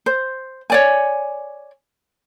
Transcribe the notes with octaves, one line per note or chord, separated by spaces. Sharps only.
C5
C#5 D5 G#5